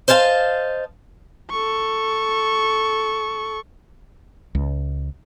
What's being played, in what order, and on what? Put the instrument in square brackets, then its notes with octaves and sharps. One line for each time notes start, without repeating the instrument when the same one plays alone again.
[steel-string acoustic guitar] C5 D#5 F5 G#5 A5
[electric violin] A4 C#6
[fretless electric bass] C#2